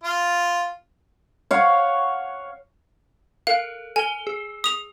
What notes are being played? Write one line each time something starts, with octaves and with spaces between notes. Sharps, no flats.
F4
C#5 F5 F#5
A4 A#4 F5
A4 G#5 G7
G#4
D#6 F7